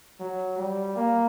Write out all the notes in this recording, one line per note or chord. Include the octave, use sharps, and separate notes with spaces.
F#3
G3
A#3